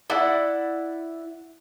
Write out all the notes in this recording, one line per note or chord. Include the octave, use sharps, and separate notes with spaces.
E4 D5 F#5